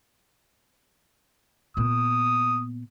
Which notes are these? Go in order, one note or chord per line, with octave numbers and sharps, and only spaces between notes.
A#2 B3 D#6